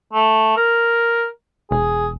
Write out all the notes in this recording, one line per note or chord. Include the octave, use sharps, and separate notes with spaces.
A3
A#4
E1 G#4